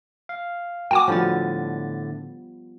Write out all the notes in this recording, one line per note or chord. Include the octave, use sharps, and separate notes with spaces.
F5
A#3 F#4 G5 G#5 D6
A2 D3 F3 G3 B3 A6